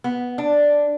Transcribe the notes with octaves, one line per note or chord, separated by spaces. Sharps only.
B3
D4